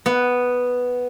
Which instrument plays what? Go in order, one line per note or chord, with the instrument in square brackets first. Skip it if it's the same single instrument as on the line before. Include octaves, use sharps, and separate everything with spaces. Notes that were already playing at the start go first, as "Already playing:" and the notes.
[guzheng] B3